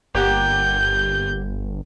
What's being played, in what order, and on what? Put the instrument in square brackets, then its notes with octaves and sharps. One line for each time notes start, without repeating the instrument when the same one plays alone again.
[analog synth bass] G1 [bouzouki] A#3 G4 F#5 [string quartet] G6